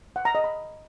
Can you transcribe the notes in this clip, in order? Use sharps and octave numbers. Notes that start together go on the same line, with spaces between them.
F#5
A#5
D#5
B5